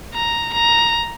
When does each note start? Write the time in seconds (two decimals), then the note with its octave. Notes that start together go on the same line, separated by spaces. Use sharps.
0.14 A#5
0.54 A#5